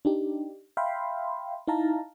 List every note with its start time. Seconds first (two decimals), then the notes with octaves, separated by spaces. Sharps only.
0.05 D4 D#4 G4
0.77 E5 F5 G5 B5 C6
1.67 D#4 E4 F5 A5 A#5